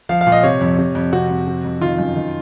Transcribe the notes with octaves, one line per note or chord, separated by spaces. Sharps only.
F3 F5
F5
A#2
D#5
C3 C#5
F2
C3
F2
C3 F#4
F2
C3
F2
D#3 F4
F#2
D#3